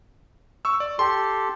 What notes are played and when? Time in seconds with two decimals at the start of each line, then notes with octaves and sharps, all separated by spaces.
0.65 C#6 E6
0.80 D5
0.99 G4 A4 C6